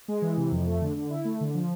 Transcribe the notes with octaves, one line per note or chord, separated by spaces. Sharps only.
G#3
E3
C3
F2
A3
D3
D3
E4
A3
D3
F3